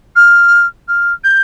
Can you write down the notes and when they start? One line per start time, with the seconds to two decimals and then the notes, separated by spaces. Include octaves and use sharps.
0.16 F6
0.88 F6
1.24 G6